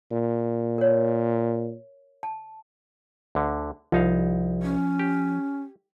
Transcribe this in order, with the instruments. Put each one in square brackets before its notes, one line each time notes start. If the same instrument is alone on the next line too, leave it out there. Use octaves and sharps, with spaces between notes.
[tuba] A#2
[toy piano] A#4 C#5
A5
[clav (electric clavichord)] D2 D3
[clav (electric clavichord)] C2 D#4 F5 [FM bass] F3
[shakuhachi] C#4
[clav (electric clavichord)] G4